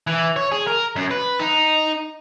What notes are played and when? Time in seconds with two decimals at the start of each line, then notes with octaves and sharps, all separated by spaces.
0.07 E3
0.36 C#5
0.52 G#4
0.67 A#4
0.96 F#2
1.11 B4
1.39 D#4